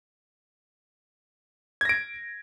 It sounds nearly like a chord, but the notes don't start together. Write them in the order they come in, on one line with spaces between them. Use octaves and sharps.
G#6 A#6 D7